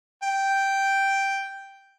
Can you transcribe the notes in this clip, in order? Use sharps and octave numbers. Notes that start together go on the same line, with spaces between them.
G5